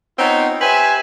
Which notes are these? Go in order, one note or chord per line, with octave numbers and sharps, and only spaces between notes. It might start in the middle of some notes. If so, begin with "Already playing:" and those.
B3 C4 D#4 F4 C#5
G4 B4 C5 E5 G#5